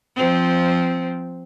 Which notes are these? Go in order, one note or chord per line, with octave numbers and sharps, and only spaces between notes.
F3 C4